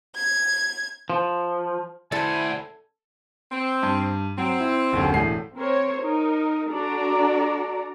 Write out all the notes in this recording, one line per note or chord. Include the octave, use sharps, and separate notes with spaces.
G#6
F3
E4 F#4 A4 C5 D5 G#5
C4
G2
F#3 C4
E4
F#1 D#2 D3
E1 A2 C7
C4 A#4 C5 C#5
D#4 A#4
D4 F#4 A4 D5 A#5